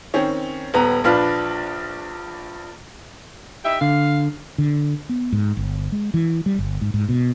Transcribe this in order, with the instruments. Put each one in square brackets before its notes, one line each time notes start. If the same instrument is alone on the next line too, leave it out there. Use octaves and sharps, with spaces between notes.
[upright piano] D#3 C4 C#4
D#1 B3 A#5
A#1 F3 D4 F4 B4 F6
[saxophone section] D#4 G4 E5
[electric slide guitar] D3 [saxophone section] F5
[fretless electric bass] D3
B3
G#2
G1
G#3
E3
G3
G1
G#2
G#2
B2